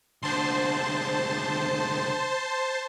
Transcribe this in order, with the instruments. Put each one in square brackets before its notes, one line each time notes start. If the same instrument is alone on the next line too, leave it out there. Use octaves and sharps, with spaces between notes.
[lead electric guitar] C2 D3 [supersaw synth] C5 A5 C6